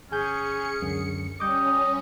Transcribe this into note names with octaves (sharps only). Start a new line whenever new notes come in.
G1 C#4 G#4 G#5 G6 C#7
C#2 F#2 D3
G3 C#4 D#5 D6 D#6 G6